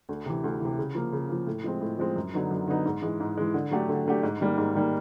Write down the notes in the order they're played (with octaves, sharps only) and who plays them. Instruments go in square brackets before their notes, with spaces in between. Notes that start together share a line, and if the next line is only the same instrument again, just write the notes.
[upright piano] D2
C3 E3
D2
C3 E3
C#3
F3 A#3
C#3
F3 A#3
A2
F3 G#3 C4
A2
F3 G#3 C4
F#2
D3 F#3 B3 D#4
F#2
D3 F#3 B3 D#4
G#2
E3 G#3
G#2
E3 G#3
D3
F#3 A3 D4 G4
D3
F#3 A3 D4 G4
G#2
D#3 G3 A#3
G#2
D#3 G3 A#3